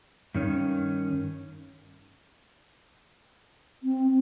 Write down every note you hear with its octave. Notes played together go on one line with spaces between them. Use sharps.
G2 D#3 C#4
C4